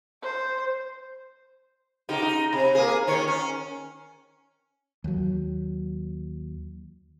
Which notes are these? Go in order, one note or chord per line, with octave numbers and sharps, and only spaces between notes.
C5
C#3 D#4 G4
D#4
C3
A#3 G#4
D#3 C#4 C#5
C#4
D#2 F#3